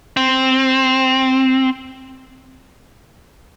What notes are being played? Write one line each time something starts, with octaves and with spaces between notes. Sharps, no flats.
C4